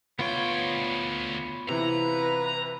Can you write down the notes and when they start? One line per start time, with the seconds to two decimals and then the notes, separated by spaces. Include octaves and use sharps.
0.19 D2 B3 F4 C#5 G5
1.69 C3 E3 E4 B4 A#5